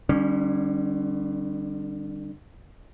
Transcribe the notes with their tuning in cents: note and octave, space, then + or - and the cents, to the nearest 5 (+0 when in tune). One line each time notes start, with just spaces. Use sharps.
D3 +35 G3 +0 C#4 -10